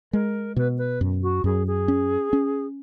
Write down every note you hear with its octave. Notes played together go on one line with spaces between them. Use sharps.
G#3 A#4
B2 B4
B4
F#2
F#4
F#2 G#4
G#4
C#4
C#4